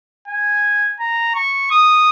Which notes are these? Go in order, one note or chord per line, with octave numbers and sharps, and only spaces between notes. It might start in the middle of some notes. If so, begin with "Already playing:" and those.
G#5
A#5
C#6
D#6